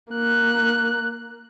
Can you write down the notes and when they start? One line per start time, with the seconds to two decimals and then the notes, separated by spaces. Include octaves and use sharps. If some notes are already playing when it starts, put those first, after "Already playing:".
0.12 A#3 F#6